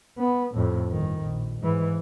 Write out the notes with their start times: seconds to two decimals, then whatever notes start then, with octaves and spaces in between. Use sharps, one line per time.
0.19 B3
0.55 F2 A2
0.90 G1 D#3
1.22 A#1
1.61 G#2 E3